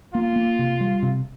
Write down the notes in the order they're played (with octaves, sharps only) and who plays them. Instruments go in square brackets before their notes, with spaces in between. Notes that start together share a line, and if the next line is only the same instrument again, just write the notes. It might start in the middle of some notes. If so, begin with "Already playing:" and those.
[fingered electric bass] A#3 [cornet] F4
[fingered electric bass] A#3
C3
G3
C3